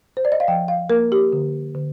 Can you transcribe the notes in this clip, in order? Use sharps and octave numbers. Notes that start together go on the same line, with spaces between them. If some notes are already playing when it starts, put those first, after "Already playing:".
C5
D5
D#5
F5
F3 G5
F5
A#3 A#4
G4
D3
D3